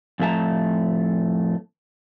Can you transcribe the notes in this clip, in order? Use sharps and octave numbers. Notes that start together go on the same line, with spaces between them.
F2 A2 A3 A5 A#5